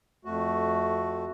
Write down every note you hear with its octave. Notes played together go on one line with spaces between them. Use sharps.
F2 A3 F#4